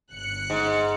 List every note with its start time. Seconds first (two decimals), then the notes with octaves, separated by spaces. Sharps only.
0.10 G1 F#6 C#7
0.50 G#2